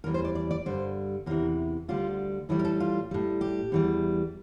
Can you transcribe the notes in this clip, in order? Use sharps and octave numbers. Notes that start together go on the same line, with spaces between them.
E2 E3 G3 A#4
C5
D5
D5
D5
G2 D3 G3 C5
E2 C3 E3 A#4
D2 D3 G3 F4
A2 E3 G3 E4
A#4
A4
F4
A2 G3
G4
E2 E3 G3